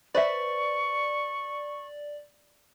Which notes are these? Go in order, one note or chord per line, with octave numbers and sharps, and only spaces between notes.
B4 C5 D5 E5 C#6